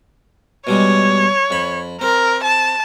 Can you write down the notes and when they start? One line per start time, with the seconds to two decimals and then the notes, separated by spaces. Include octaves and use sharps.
0.67 B2 G3 G#3 C#5
1.51 F2 B5
2.01 C4 A#4
2.44 A5